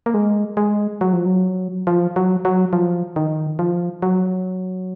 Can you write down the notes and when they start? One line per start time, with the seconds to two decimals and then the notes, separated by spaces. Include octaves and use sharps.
0.06 A#3
0.14 G#3
0.57 G#3
1.01 F#3
1.13 F3
1.26 F#3
1.87 F3
2.16 F#3
2.45 F#3
2.73 F3
3.16 D#3
3.59 F3
4.02 F#3